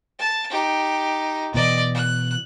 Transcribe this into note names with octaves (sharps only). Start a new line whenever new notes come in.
A5
D#4 G4
B2 E3 D5 D#5
F#6